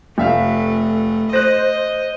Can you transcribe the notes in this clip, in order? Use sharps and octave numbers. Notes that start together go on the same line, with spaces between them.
F1 A3 E5 F5
C5 D#5 F#6 A#6